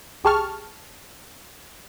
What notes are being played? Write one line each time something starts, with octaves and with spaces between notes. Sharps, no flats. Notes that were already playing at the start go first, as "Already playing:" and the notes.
C2 G4 G#4 A5 C#6 F6